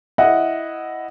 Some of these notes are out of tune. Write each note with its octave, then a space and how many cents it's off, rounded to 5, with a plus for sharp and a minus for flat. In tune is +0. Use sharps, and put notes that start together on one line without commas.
E4 +0 D#5 +0 F#5 +0